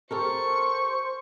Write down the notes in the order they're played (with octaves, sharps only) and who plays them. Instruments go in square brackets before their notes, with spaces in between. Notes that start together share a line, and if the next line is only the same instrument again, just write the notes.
[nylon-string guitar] G4 A4 A#4 [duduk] C5 [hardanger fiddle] C#6